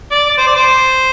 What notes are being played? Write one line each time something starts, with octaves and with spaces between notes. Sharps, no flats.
D5
D5
C5
D5
C5